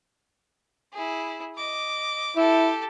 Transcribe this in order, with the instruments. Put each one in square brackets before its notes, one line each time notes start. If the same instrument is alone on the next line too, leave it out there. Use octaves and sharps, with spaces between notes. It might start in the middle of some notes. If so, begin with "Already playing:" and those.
[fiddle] E4 G#4
D#5 D6
[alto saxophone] E4 [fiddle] G4 A4